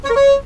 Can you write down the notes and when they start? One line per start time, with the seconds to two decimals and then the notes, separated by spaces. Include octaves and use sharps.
0.04 C#5
0.10 A#4
0.15 C#5